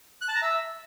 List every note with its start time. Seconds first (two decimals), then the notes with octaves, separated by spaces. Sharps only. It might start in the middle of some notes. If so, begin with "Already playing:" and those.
0.21 F#6
0.28 A5
0.35 A#5
0.42 E5